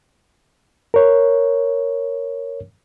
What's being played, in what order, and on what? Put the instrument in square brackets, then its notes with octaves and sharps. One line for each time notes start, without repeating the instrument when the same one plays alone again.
[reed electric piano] A#4 C#5